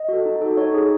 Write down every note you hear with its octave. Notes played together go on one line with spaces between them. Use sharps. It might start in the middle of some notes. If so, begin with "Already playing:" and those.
Already playing: D#5
F#4 A4
D#4
F#4 A4
D#4 C#5
G#4